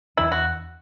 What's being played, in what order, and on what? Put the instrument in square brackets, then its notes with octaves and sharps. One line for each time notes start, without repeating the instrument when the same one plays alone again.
[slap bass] E2 E3 D4 [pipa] E4
[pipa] F#4